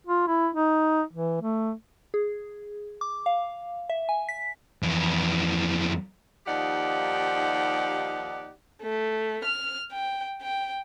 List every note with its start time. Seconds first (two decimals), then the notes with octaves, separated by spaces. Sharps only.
0.07 F4
0.27 E4
0.55 D#4
1.13 E3
1.41 A3
2.14 G#4
3.01 D6
3.26 F5
3.90 E5
4.09 G#5
4.29 B6
4.83 F2 E3
6.46 D#2 F3 D#4 G4 D5 F#5
8.82 A3
9.44 F6
9.92 G5
10.42 G5